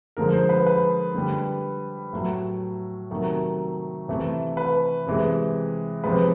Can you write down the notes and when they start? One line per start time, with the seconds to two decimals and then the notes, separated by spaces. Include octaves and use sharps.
0.17 D3 F3 G#3 A#4
0.33 C5
0.49 B4
0.66 B4
1.14 D3 G3
2.13 A2 F#3 A3
3.11 C3 D#3 F#3 A3
4.08 C3 E3 A3
4.57 B4
5.06 C3 E3 G#3
6.04 C3 F3 G#3 B4